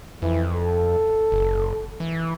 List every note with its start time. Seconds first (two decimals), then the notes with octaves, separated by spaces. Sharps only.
0.22 F2 E3
0.55 A4
1.32 F#1
2.00 E3